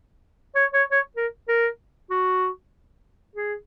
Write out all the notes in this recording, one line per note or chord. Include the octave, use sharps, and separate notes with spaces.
C#5
C#5
C#5
A#4
A#4
F#4
G#4